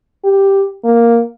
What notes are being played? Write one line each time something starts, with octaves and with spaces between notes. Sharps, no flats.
G4
A#3